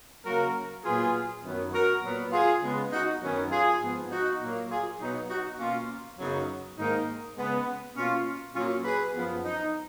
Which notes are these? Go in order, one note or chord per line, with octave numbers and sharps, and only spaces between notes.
C#3 F#3 A#3 F#4 A#4
A#2 F#3 B3 F4 G#4
F#2 D#3 F#3 B3
F#4 A#4
A#2 F#3 B3
F4 G#4
C#3 G#3 B3
D#4 F#4
F#2 D#3 F#3 B3 C#4
F4 G#4
G#2 F3 B3
D#4 F#4
A#2 F#3 A#3
F4 G#4
B2 F#3 B3 D#4
D#4 F#4
B2 A#3 C#4 F4
F#2 C#3 F#3 B3 D#4
G#2 D#3 A#3 D#4
C#3 G#3 B3
B2 A#3 C#4 F4
A#2 F#3 A#3 C#4 F4
G#4 B4
F#2 F3 B3
D#4